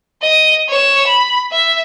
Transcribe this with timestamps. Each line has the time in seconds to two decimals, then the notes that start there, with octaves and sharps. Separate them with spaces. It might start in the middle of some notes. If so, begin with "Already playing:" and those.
0.22 D#5
0.69 C#5 E7
1.07 B5
1.51 E5